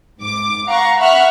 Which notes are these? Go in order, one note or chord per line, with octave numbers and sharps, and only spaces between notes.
G#2 D6
F5 F#5 A#5 C#6
E5 F#5 B5 C#6 F6 F#6